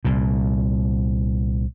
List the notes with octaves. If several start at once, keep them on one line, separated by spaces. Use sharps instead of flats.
C2 A#2